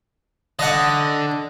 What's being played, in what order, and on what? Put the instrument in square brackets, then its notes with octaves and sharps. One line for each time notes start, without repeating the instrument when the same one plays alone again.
[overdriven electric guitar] D3 [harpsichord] D#5 F#5